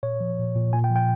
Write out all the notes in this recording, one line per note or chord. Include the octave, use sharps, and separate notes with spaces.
A#2 C#5
F3
A#2
A#2
A#2 G#5
G5
F3
G5